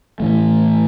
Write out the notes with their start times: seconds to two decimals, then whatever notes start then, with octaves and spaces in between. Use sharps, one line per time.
0.20 A2 E3 A3